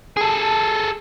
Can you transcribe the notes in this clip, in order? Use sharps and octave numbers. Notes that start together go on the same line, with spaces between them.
G#4 A4